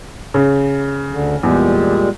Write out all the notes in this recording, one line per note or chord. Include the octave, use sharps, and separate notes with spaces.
C#3
D2 D3
E2 A#2 G3 G#3